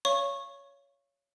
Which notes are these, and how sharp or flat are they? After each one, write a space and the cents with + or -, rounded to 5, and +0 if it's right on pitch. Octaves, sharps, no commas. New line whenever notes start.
C#5 +15 F5 -25 C#6 -15